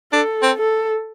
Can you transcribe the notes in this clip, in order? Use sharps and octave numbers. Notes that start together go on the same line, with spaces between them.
D4 A4
C4
A4